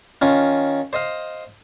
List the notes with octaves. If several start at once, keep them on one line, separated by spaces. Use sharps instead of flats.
D#3 C#4 F4
C5 D#5 F5